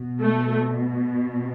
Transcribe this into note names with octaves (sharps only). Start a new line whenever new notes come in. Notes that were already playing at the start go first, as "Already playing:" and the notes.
Already playing: B2
A3